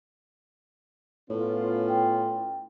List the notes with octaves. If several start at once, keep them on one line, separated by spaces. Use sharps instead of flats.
A2 B3 C#4 F4 C#5
G5